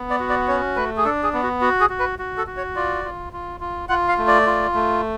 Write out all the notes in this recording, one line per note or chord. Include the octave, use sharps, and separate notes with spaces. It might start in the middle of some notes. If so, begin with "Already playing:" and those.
Already playing: B3
D5
F#4
D5
C#4 C#5
A3 B4
G#4
D4 A4
G#4
B3
F#4
F#4
G#4
F#4
B4
F#4
A4
F#4
C#5
F4 D5
F4
F4
F4
F4 F#5
F5
A3
D5
F4
A3